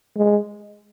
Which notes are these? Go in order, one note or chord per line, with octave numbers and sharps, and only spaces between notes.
G#3